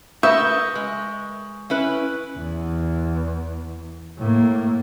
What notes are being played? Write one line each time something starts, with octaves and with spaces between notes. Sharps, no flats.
A#4 B4 E5 C#6 D#6 G6
G#3
C#4 E4 B4
E2
A2 A#3